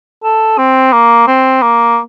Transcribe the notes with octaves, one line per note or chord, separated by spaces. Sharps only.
A4
C4
A#3
C4
A#3